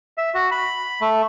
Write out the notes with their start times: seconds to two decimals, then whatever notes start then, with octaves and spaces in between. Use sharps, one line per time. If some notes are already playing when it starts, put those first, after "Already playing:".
0.18 E5
0.35 F#4
0.51 B5
1.01 A3